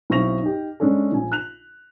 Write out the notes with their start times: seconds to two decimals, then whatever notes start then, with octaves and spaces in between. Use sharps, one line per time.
0.10 B1 C4 E4 C#6 A#6 F7
0.42 D#4 G4
0.80 G#3 C#4 D4 A4
1.12 A#1 G#5
1.32 F#6 F7